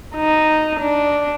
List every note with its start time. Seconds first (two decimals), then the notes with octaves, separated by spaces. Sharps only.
0.16 D#4
0.80 D4